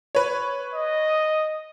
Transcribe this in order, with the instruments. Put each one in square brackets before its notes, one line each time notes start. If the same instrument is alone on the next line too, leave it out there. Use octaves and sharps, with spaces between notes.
[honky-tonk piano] B4 C#5
[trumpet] D#5